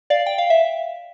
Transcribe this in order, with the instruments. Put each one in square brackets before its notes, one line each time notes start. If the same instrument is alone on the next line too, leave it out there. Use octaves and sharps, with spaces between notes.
[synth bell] D5 F5
G5
F5
E5